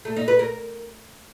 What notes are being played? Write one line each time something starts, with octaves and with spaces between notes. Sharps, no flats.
A3
D#4
B4
A#4